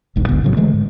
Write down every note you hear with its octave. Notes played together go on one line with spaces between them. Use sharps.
E1 B1 G2
D1 G#1 D2 B3
A2 C#3 F#3
D3 E3 G#3 A3
G#2